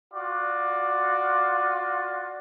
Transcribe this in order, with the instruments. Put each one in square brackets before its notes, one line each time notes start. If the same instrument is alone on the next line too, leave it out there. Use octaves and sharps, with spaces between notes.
[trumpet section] F4 F#4 D5